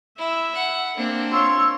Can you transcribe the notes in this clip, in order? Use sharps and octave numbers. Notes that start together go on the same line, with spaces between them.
E4 E5
F#5
A#3 C4 D4
F4 C#5 C6 E6